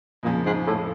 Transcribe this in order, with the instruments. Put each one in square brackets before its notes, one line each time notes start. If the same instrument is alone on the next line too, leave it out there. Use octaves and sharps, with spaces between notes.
[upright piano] F2 C#3 F3 G#3 [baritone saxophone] A#2
[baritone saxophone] G#2
A2